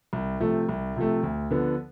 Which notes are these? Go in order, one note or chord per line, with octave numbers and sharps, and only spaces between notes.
C2
C3 F3 A3
C2
C3 F3 A3
D2
D3 F3 B3